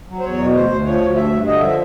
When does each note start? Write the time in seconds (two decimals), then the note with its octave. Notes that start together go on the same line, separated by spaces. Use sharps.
0.09 F#3
0.20 C5
0.24 E2 C#5
0.40 B2
0.54 D2 C5
0.70 D2
0.85 F3 C#5
1.00 D2
1.16 G2 E5
1.31 G2
1.47 D3 D#5
1.60 F3 E5